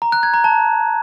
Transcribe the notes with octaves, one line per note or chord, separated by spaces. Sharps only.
A#5
F#6
G#6
A#5
A5